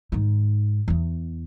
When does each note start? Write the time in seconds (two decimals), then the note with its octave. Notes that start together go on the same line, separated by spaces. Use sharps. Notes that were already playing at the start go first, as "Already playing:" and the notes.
0.12 G#2 D#3
0.88 E2 B3